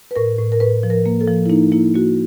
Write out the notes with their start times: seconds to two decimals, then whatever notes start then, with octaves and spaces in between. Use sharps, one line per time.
0.11 B4
0.16 A2 A#4
0.38 A2
0.52 A#4
0.60 A2 B4
0.83 F3
0.90 A#4
1.06 A#3
1.21 A4
1.27 F3
1.46 E4
1.50 A#3 D#4
1.72 A#3 E4
1.94 A#3 F#4